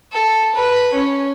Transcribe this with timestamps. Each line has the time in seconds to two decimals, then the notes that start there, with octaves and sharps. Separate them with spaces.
0.13 A4
0.55 B4
0.94 C#4